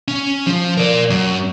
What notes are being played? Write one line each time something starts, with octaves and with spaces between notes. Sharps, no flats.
C#4
F3
A#4 D5
F#2